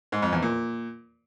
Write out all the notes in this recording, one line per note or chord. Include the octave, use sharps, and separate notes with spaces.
G#2
F2
E2
A#2